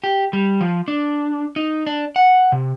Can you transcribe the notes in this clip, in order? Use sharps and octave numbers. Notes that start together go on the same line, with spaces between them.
G4
G3
F3
D4
D#4
D4
F#5
C3